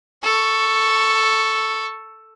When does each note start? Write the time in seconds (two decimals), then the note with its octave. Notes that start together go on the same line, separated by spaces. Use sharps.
0.24 A4 C#6